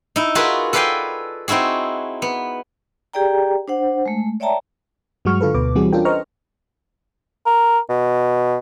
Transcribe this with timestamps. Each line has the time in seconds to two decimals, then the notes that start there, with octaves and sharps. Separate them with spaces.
0.16 D#4 E4
0.35 F4 F#4 G#4 A#4 B4 E5
0.73 A4 B4 D5 F5 G5 G#5
1.48 C4 D#4 E4 F#4 G#4
2.22 B3
3.13 G4 G#4 D5 G5 A#5
3.68 D4 C5 F#5
4.06 G#3 A3
4.40 C#5 D5 E5 G5 A5 A#5
5.25 G2 F#3 G#3 F#4 C#6 F6
5.41 D3 F4 A4 B4
5.54 D2 B2 B4 D6
5.75 E3 G3 C4 F#4 G#4
5.93 C#4 D4 F4 A4 A#4 G5
6.05 B4 C5 D#5 A#5 C#6 F6
7.46 A#4
7.90 B2